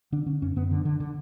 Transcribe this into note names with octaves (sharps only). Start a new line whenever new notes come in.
D3 D4
D3 C#4
F#2 C#4
F#2 B3
D3
D3
D3